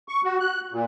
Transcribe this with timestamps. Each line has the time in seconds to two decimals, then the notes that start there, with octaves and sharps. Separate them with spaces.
0.08 C#6
0.24 F#4
0.40 F#6
0.72 A#2